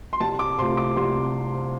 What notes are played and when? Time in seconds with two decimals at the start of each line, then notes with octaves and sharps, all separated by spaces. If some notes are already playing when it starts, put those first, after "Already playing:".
0.13 C6
0.20 C2 A5
0.39 D6
0.58 C3 A3 F4 C6
0.77 D6
0.96 C2 C6